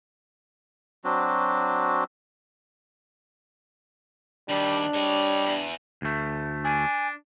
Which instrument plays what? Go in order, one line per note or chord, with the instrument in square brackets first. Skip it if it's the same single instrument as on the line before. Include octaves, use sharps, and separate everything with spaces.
[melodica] F#3 C4 D4 F#4
[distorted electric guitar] D#2 [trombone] G3 [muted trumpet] D4
[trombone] G3 [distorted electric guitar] C#5 D#5
[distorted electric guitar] E2
[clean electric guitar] D2 A3
[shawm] D4 [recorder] G#5